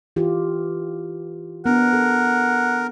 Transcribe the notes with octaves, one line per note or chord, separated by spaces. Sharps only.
E3 F4 G4
B3 D4 A#4 F#5
A4